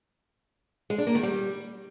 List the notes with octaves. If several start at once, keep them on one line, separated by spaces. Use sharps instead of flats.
G#3
D4
A#3
D#3
G3